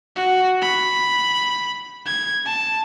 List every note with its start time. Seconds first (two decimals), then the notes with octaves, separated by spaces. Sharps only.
0.16 F#4
0.62 B5
2.06 G#6
2.46 A5